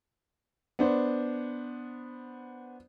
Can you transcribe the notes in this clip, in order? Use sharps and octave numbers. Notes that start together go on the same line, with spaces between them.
B3 D4 C5